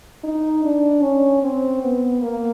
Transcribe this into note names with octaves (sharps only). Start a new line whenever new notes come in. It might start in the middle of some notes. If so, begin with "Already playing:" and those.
D#4
D4
C#4
C4
B3
A#3